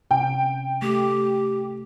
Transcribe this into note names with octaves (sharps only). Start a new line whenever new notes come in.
C3 C#4 G5
A3 G4